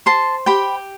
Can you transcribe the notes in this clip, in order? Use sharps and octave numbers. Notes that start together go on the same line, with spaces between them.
C5 A5 C6
G4 G5 B5